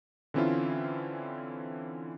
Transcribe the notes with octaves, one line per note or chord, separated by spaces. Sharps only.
D3 E3 C4 C#4 E4 F4